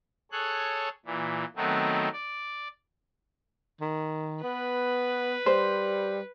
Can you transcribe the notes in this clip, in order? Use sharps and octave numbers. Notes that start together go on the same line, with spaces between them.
G#4 A4 C#5 F#6
A#2 E3
D#3 F#3 A3 B3 C4 D#4
D5
D#3
B3 B4
G3 C5